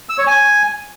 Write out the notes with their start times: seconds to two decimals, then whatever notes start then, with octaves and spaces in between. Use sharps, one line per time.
0.09 E6
0.18 C#5
0.27 G#5